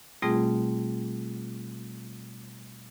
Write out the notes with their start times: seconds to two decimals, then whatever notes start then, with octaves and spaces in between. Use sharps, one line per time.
0.22 B2 G3 A3 C4 F4 G#4